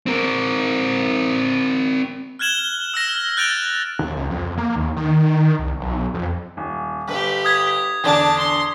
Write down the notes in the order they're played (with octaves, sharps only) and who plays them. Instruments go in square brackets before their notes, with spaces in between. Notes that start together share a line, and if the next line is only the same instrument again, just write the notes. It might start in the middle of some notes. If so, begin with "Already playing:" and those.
[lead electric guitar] C4 A#4
[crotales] F6 F#6 G#6 E7 F#7 G7
E6 F6 A#6 E7
F#6 G6 A6 D7 F7
[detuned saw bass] D#2
C#2
F2
A#3
D#2
D#3
C2
B1
F2
[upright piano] D#1
[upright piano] G1 [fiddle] G4 B4
[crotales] D#6 G#6 B6
[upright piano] E2 D3 D6 [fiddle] D4 A5
[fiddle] C6